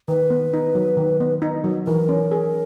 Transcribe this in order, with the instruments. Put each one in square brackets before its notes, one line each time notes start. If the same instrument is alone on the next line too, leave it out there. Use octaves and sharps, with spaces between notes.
[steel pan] D#3 [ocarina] B4
[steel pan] B3
D#4
F#3
D#3
B3
D#4
F#3
[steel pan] E3 [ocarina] A#4
[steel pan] C#4
G#4